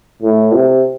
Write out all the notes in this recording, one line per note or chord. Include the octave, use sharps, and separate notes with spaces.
A2
C3